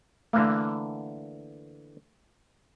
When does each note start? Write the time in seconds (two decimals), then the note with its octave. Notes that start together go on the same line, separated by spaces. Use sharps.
0.33 D3 E3 A3 A#3